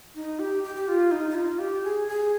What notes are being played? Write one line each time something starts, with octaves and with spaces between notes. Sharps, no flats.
D#4
G4
G4
G4
F4
D#4
D#4
F4
G4
G#4
G#4